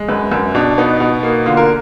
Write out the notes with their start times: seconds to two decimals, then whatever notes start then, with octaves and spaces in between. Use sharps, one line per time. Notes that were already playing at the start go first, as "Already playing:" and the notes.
Already playing: G#3
0.09 F#2 B4
0.32 F#2
0.54 B2 D4
0.78 B3 D#4
1.00 B2
1.23 A#3
1.46 D3 F4
1.57 A#4